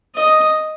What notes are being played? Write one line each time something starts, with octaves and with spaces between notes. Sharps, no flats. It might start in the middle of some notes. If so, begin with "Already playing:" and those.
D#5